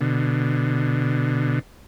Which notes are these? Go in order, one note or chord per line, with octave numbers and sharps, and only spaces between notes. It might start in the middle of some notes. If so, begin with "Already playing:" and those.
B2 D3